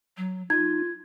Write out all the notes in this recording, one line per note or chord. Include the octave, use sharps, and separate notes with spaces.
F#3
D#4 F4 G#6